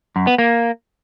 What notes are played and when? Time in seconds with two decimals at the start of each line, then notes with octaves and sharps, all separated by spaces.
0.16 F#2
0.27 B3
0.38 A#3